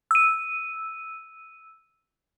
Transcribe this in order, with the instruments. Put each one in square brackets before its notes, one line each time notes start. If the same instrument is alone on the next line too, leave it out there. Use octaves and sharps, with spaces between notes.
[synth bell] E6 D#7